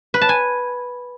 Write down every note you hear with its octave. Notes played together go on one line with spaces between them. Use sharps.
B4
A5
G#5